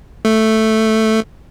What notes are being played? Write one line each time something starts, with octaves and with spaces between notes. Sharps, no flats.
A3